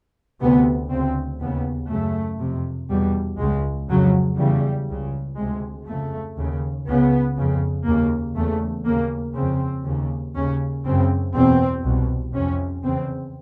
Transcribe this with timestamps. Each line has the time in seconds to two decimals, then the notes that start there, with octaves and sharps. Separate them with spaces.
0.41 D2 C3 B3
0.91 D2 C#3 C4
1.40 D#2 C#3 B3
1.90 F#2 C#3 A3
2.39 F2 C3
2.90 E2 B2 G3
3.40 C#2 C#3 G#3
3.89 F2 C#3 F#3
4.39 E2 C#3 G3
4.88 C#2 C#3
5.38 D2 C3 G#3
5.87 F2 C#3 A3
6.37 D#2 C#3
6.87 C#2 C#3 B3
7.37 F2 C#3
7.86 D#2 C#3 A#3
8.36 E2 C#3 A3
8.86 D#2 C#3 A#3
9.35 F2 C#3 C4
9.85 D#2 C#3
10.35 D#2 C#3 C#4
10.85 F#2 C#3 C4
11.34 E2 B2 C4
11.83 C2 B2
12.34 F2 C3 C#4
12.84 E2 C#3 C4